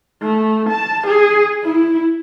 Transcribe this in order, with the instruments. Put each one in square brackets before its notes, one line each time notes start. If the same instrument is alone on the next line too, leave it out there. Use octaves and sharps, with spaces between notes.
[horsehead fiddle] A3
A5
G#4
E4